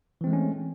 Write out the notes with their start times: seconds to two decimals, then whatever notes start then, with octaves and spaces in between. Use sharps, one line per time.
0.21 E3
0.24 C4
0.27 G#3
0.30 A3
0.33 C#4